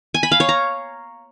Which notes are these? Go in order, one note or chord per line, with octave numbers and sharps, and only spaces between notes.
G#5
B5
F5
C#5
A#5